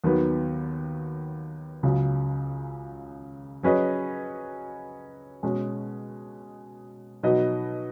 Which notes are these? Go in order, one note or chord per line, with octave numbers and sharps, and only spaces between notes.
D#2 D#3 F#3 B3
C#2 C#3 F#3
F#3 C#4 G#4 B4 D#5
B2 G#3 C#4
B2 F#3 D#4 B4 D#5